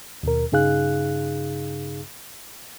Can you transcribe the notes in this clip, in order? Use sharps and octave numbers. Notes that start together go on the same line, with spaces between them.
D#2 B2 A#4
G2 C#3 D#4 G#4 F5 F#6